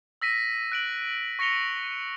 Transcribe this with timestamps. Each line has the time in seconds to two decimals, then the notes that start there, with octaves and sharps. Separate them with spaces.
0.22 E6 A#6 B6 D#7
0.72 F#6 D7 F#7
1.39 C#6 A#6 C#7 F7 G7